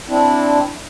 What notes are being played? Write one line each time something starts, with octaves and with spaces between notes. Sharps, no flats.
C4 D4 E4